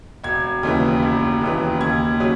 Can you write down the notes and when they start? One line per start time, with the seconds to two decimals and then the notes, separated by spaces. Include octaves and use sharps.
0.24 E1 G#6
0.63 D#2 C#3 E3
1.02 E1
1.41 D#2 C#3 E3
1.81 D#2 G#6
2.20 C#3 F#3